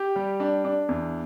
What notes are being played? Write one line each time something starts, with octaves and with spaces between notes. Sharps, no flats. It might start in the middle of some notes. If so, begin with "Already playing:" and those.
Already playing: G4
G3
D4
D4
E2